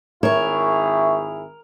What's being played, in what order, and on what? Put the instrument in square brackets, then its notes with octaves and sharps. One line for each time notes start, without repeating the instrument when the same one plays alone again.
[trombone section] G#1 E4 G#4 [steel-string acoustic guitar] A#4 [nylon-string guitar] C#5 [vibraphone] E5 C#6